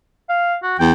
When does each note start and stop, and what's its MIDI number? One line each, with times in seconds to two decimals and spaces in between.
0.29 0.55 77
0.63 0.74 66
0.79 0.93 40
0.79 0.92 79